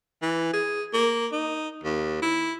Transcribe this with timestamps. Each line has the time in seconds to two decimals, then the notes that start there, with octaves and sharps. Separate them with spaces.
0.22 E3
0.53 G#4
0.93 A#3
1.32 D#4
1.84 D#2
2.22 E4